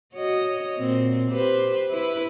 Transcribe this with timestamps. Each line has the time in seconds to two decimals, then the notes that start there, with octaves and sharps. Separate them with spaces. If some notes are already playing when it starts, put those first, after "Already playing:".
0.14 F#4 C#5 D#5
0.77 A#2 C4
1.31 G4 B4 C5
1.91 E4 B4